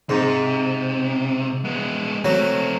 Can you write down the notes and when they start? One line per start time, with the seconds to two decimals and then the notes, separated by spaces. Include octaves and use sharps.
0.09 G#2 C3
1.65 G#3 B3
2.25 F#3 A3 C4